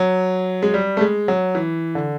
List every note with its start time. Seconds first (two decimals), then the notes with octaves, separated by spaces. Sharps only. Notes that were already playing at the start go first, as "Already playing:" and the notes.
Already playing: F#3
0.62 G#3
0.74 G3
0.97 A3
1.01 G#3
1.28 F#3
1.55 E3
1.95 D3